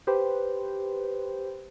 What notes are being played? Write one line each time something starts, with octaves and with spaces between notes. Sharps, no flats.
G4 B4 C5